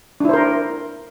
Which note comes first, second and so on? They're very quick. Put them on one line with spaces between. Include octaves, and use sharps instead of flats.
D4 E4 C5 A#4